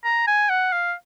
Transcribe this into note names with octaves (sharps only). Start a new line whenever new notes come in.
A#5
G#5
F#5
F5